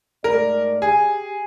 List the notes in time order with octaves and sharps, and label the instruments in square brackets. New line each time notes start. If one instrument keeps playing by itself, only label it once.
[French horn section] G#2 A3 D5 [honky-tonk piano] A#4
[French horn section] G4 [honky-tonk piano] G#4